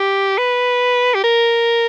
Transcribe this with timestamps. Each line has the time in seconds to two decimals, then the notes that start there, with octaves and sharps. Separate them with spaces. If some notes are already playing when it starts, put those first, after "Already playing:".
Already playing: G4
0.38 B4
1.15 G4
1.24 A#4